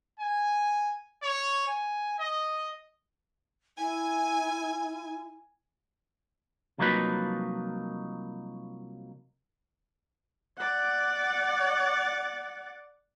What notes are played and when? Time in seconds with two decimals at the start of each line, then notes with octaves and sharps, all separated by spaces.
0.20 G#5
1.23 C#5
1.68 G#5
2.19 D#5
3.78 E4 G#5
6.78 C2 F3 F#3 A#3 D#4 B4
10.58 D5 F#5